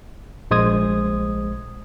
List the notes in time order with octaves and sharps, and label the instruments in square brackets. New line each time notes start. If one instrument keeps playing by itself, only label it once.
[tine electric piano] A#1 G#3 C5 D#6 G#6